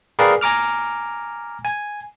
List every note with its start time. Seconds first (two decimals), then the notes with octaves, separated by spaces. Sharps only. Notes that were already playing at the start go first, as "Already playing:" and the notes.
0.19 G#4 A#4 B4 D5 F5 G5
0.41 G#5 A#5 D6 F6
1.65 G#5